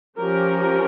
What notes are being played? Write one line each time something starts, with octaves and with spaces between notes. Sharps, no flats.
F3 C#4 G4 A#4